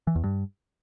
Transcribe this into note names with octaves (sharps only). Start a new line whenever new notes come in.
E3
E2
G2